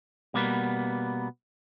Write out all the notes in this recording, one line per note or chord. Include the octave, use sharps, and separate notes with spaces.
B2 G3 A#3 B3